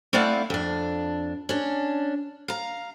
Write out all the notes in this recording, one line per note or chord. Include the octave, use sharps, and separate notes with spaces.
A3 C4 E4 D5 F5 F#5
F2 D4
C#4 D4
F5 A#5